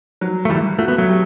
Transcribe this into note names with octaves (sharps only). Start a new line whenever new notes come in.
F#3
A3
D2 E3 G3
A3 F#4
B3
F#3 A3
G3